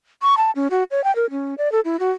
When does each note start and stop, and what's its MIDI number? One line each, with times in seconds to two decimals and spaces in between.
0.22 0.35 85
0.37 0.51 81
0.56 0.68 61
0.71 0.84 66
0.91 1.04 73
1.04 1.14 79
1.16 1.30 70
1.30 1.55 61
1.58 1.71 74
1.72 1.80 69
1.85 1.99 64
2.00 2.10 66